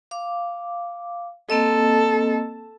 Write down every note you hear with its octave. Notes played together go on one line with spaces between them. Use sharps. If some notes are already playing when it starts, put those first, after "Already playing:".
F5 D6
A#3 C4 A4 D#5